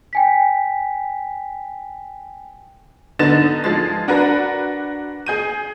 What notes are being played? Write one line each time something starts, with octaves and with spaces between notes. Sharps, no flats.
G5 G#5 B6
D3 B3 D#4 A6 E7
F3 G#3 A6
D4 F#4 A#4 B4
G#4 G6 D#7